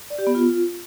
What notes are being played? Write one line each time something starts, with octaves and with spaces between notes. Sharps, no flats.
D5
G4
B3
F4